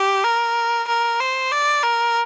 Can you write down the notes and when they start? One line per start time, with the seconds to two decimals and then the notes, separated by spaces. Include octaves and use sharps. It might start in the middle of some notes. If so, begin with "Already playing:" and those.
Already playing: G4
0.24 A#4
0.88 A#4
1.20 C5
1.51 D5
1.83 A#4